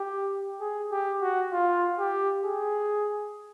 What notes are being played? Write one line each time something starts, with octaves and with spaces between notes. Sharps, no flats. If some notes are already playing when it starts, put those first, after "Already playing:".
Already playing: G4
G#4
G4
F#4
F4
G4
G#4